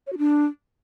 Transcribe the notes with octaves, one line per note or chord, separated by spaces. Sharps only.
C#5
F#4
D4